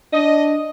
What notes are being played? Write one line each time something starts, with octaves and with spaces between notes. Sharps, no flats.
D4 D#5